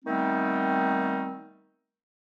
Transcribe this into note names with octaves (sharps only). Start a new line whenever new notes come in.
D#3 G3 A3 B3 C4 D#4